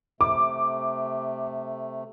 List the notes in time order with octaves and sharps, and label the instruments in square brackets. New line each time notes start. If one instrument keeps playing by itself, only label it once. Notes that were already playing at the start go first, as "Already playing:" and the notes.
[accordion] C3 A3 [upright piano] D6